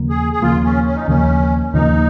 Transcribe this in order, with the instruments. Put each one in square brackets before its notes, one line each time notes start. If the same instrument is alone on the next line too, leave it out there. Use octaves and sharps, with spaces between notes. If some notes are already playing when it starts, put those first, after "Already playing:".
Already playing: [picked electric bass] D#2 C#3 F3 A#3
[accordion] G#4
G#4
[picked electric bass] D#2 C#3 F3 A#3 [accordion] F4
[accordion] C#4
C#4
D#4
[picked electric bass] D#2 C#3 F3 A#3 [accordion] C#4
[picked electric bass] D#2 C#3 F3 A#3 [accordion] D#4